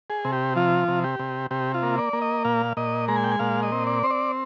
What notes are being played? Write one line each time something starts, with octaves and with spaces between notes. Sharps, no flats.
G#4
C3
G4
F3 F4
C3
G4
C3
C3 G4
F4
A#3
D5
A#3
D#5
A#2 F5
A#2 D#5
G#3 A#5
G#5
G5
G#5
A#2 F5
D#5
C4
D5
C4 C5
D5